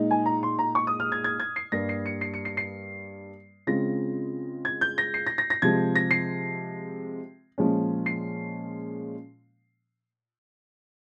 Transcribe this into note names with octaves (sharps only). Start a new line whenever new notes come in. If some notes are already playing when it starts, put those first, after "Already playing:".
Already playing: A#2 G#3 D#4
G#5
A#5
C6
A#5
C#6
D#6
F6
G#6
G#6
G#6
C7
G2 G3 A#3 A#6
C7
C#7
C7
C#7
C7
C7
C#3 G#3 C4 F4 A#6
G#6
G6
A#6
C7
A#6
A#6
A#6
C3 F3 G#3 G#6
A#6
C7
A#2 F3 G#3 C#4
C7